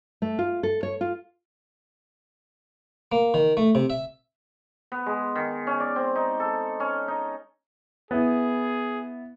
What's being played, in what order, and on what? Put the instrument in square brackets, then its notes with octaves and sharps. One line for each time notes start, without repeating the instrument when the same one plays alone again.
[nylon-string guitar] A3
F4
A4
C#5
F4
[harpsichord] A#3
D#3
A3
C3
E5
[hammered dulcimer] B3
G#3
D#3
C#4
D5
C4
D#4
A4
C#4
D#4
[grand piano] B3 E4 [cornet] G#4